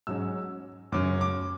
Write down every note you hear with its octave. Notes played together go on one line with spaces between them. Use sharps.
G#2 F#3 C#4 E6
F#2 C#3 F#3 C#4 D6
D6